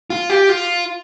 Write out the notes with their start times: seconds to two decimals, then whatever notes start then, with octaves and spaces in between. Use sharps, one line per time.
0.10 F4
0.30 G4
0.49 F4